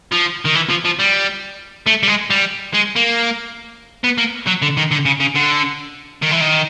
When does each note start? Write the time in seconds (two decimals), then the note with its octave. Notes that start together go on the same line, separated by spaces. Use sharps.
0.12 F3
0.45 D#3
0.55 E3
0.69 F3
0.85 F3
0.99 G3
1.87 A3
2.03 G3
2.07 G#3
2.30 G3
2.74 G#3
2.96 A#3
4.04 B3
4.18 A#3
4.47 F#3
4.62 D3
4.77 D#3
4.91 D3
5.06 C#3
5.20 C#3
5.35 D3
6.22 D#3
6.31 E3
6.41 D#3